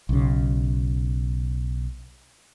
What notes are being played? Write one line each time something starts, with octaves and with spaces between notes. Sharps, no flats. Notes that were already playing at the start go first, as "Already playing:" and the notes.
B1 C#3